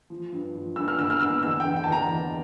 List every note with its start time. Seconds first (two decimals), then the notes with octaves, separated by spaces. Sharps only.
0.10 F3
0.32 G2
0.55 F3
0.76 G2 E6
0.88 F6
0.98 D3 E6
1.10 F6
1.21 G2 E6
1.43 E2 E6
1.60 G5
1.65 D3
1.76 G5
1.84 E2 A5
1.92 A#5
2.08 E2